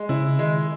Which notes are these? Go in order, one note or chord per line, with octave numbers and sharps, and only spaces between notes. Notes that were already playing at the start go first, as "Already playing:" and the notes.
Already playing: G#3
C#3 E4
D#3 G#3